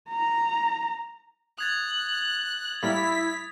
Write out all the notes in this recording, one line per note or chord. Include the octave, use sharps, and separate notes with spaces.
A#5
D#6 F#6 G#6 A6
A2 G3 A#3 E4 B6